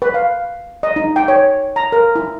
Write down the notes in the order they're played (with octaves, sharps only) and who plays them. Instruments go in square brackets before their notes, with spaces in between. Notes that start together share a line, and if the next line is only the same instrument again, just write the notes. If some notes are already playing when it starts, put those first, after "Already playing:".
[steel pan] B4
F5
D#5
D#4
G5
C#5
A#5
A#4
E4